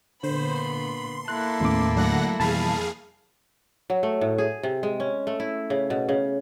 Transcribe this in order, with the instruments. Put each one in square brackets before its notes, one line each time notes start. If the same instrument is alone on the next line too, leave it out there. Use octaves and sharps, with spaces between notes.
[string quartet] A#2 B3 B5 [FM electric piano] D3 [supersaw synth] C5
[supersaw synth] C6
[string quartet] A#3 E4 A4 [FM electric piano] F#6
[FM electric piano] D#2 A2 D6 [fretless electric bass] A3 B3 C#4
[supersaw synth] D3 F#5 A#6 [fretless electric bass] F#3 A3
[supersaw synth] F2 G#4 F5 [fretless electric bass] B2 E3 G3 [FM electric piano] A5 B5
[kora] F#3
A3
A2
G#4
C3
G#3
C#4
A3
E4
C#3
B2
C#3